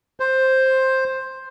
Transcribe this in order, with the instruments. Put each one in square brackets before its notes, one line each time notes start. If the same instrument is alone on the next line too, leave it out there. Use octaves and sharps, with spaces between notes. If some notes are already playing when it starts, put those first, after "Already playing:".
[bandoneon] C5